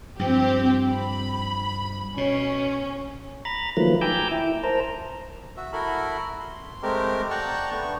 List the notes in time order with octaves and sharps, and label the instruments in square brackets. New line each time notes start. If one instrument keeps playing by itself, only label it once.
[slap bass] G2 F3 [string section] C4 G4
[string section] B5
[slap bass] B2 [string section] C#4
[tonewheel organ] A#5 B5 A6
D#3 F3 F#3 A3 A#3 B4
G5 G#5 A#5 D6 E6 G6
E4
A#4 C5 A5 A#5
[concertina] F#4 E5
E4 F#4 A4 A#4 B5
C6
G#3 A3 C4 G4 A#4
D5 F#5 G5 A5 A#5 C#6
A3 B3 D4 C#6